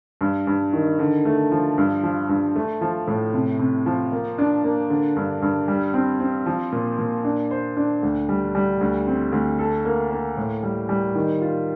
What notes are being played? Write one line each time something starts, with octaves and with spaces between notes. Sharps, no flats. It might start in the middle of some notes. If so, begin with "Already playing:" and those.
G2
G2
D#3
D3
A3
F3
G2
F3
G2
A3
F3
A2
C3
C3
F3
A#3
D4
A#3
D3
G2
G2
G3
C4
C4
F3
A#2
A#2
D4
C5
D4
D2
G3
G3
D2
C4
D2
A4
A#3
A#3
A2
G3
G3
D#3
F4